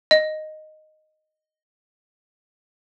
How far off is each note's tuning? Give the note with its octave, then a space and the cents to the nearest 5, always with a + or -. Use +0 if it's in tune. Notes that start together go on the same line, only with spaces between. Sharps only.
D#5 -5